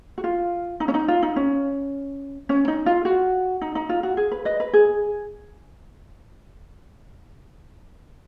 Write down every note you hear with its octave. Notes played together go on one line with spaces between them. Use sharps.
F#4
F4
D#4
C#4
D#4
F4
D#4
C#4
C#4
D#4
F4
F#4
D#4
D#4
F4
F#4
G#4
B4
B4 D#5
B4
G#4